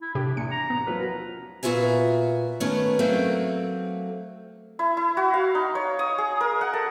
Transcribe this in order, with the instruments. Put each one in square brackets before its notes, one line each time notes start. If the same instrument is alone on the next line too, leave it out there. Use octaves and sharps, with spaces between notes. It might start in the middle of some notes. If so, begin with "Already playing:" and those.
[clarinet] E4
[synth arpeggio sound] A2 C3 G4 [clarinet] D4
[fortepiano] E2 [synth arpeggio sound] C#7
[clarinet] A#5
[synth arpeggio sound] B3
[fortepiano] F3 F#3 A#4 [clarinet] B4
[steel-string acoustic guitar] A#2 B3 F4 F#4 E5 G#5
D#3 A3 B3 C#4
F#3 A3 A#3 C4
[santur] E4
E4
F#4
F5
D#4
C#5
D#6
G#4
A#4
F#5
A4